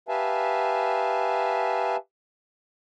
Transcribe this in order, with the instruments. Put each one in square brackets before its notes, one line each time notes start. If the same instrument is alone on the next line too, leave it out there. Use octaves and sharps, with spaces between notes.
[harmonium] G4 B4 E5 F5 G#5 A5